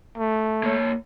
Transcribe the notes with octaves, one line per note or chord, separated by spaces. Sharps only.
A3
A#3 C#5